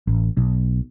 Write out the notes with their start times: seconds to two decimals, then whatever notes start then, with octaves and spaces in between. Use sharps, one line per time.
0.07 A1
0.37 B1